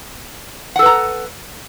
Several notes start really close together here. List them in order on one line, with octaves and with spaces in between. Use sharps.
F#5 A4 B4 A#5